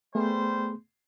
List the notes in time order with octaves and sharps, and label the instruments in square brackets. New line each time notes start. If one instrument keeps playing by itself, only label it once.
[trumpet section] G3 C5 [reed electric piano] A3 B3 G#4